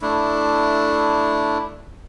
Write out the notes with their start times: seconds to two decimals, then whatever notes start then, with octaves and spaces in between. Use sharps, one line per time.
0.02 A3 D4 E4